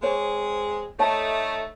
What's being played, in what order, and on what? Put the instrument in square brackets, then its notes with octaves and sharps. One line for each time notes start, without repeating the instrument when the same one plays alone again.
[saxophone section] G#3 C4 G#4 [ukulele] C5 C#5
[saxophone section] A3 D#4 [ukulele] C#5 A5